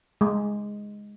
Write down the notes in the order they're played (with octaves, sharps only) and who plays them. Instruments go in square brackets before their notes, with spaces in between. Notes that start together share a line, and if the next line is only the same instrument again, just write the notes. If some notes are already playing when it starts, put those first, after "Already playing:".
[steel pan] G#3